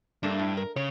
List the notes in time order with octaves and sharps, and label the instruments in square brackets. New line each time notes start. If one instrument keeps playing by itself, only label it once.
[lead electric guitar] G2 [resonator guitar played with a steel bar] A3 A#3 D4
[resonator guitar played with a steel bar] A2
A#4
[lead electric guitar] C#3 [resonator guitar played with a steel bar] C#5